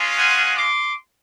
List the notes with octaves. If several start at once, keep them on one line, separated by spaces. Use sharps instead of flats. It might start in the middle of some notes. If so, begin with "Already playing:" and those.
Already playing: G#3 C#4 F4
F#5 G#5
C6 D6